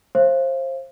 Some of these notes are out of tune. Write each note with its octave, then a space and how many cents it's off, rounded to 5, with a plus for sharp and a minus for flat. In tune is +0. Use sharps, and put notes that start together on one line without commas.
C5 +25 F5 -35